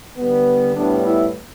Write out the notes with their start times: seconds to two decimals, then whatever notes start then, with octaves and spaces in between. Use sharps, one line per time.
0.18 D3 G3 B3
0.75 A2 G3 B3 D4
1.04 E4